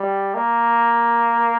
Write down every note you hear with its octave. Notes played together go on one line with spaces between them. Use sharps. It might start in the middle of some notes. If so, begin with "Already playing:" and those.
Already playing: G3
A#3